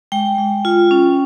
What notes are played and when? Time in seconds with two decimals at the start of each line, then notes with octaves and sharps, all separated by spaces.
0.12 G#3 G5
0.38 G#3
0.65 F4
0.91 C#4